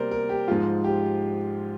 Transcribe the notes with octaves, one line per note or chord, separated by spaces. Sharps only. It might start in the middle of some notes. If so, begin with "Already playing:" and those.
Already playing: C3 G3 A#3 A#4 C5 D5
A#4
G4
G#2 F3 G#3 F4
G4